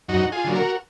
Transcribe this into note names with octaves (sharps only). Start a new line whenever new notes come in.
F#2 D#4 F#4
F4 G#4
D3 F#3 A#3
F#4 A#4